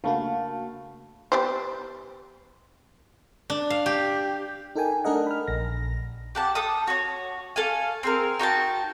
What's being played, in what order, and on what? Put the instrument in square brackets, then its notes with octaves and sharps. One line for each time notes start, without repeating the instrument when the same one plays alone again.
[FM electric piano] C#3 A#3 F#4 [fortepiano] A3 [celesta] D4 A5 B5 [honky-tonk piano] F5
[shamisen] B3 G4 C5
[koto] D4
F5
G4
[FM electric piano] D#4 A4 A#4 G5 G#5
A3 D4 A4 A#4 D#5 F#5
B5 F6
A#1 A#6
[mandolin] G4 F#5 A5
A4 A5 D#6
F#4 C#5
A4 F5 G#5
C4 G#4 A#4
D#4 F#4 G5 A5